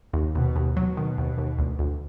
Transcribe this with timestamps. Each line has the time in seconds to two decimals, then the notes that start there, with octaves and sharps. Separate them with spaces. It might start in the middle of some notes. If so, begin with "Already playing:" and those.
0.13 D#2
0.35 D#2 B2
0.56 D#2
0.76 B2 F#3
0.97 D#3
1.18 D#2
1.38 D#2
1.59 D2
1.79 D2